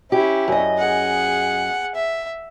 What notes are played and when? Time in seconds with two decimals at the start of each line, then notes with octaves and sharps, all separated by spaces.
0.12 C#4 E4 G4
0.48 F#2 D#5
0.79 G#4 F#5
1.95 E5